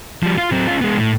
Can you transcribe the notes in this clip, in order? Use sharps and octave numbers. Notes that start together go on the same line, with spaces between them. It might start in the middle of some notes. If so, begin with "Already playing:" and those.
F3 G3
F4
F#3 C4
C#4 F4
G#3 B3
A2